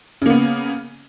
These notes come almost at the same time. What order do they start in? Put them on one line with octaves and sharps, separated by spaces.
C#3 A#3 B3